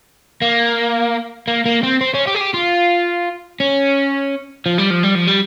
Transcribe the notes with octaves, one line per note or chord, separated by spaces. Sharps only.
A#3
A#3
A#3
C4
C4
C#4
G4
G#4
G4
F4
C#4
F3
G3
F3
G3
F3
G3